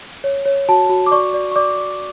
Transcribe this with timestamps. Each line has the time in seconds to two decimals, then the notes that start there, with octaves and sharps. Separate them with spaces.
0.24 C#5
0.46 C#5
0.69 F#4 A5
0.89 F#4
1.06 D6
1.12 D5 C#6
1.34 D5
1.52 C#6
1.56 D5 D6
1.78 D5